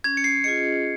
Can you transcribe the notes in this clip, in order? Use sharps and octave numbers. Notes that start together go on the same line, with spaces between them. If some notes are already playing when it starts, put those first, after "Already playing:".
C#4 G#6
C#7
C7
F4 G#4 D#5 C#7